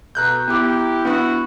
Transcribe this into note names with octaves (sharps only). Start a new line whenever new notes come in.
B2 A3 A#5 F#6 G6
B3 E4 G4 D6
B3 D4 F#4